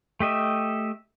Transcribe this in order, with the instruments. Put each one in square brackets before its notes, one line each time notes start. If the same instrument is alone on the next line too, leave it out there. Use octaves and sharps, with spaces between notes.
[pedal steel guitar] A3 G4 D#5 E5